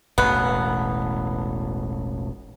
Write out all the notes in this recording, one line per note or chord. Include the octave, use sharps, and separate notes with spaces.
E1 A1 B2 B3